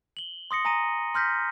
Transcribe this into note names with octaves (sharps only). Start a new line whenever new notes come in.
F#7 G7
C6 D#6 A#6 C#7
G#5 A#5 D#6 A#6 D#7
C6 F6 G6 A#6 B6